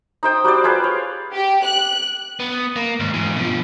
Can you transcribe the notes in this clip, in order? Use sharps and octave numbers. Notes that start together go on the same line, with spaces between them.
D#4 C5 G5 D#6
G3 F#4 C5 D5
F4 G#4 B4 C5
C#5
G4
F#6
B3
A#3
D#2 G#2
G#2 E3
B2 F3